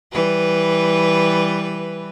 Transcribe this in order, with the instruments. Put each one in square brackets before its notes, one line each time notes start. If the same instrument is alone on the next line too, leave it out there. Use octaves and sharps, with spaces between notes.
[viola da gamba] E3 G3 B4